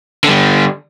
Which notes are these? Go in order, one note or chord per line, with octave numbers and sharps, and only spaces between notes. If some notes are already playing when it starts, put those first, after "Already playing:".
D3 G3